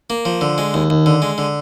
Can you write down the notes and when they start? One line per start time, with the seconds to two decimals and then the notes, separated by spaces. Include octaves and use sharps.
0.10 A#3
0.25 F3
0.41 D3
0.58 G#3
0.74 D#2
0.90 D#2
1.06 D3
1.22 G#3
1.38 D3